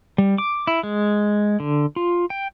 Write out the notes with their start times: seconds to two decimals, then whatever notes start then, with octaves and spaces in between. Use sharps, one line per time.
0.18 G3
0.38 D6
0.67 E4
0.83 G#3
1.60 D3
1.96 F4
2.30 G5